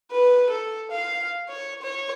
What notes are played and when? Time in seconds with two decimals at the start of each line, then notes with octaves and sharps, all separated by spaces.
0.12 B4
0.50 A4
0.91 F5
1.49 C#5
1.82 C#5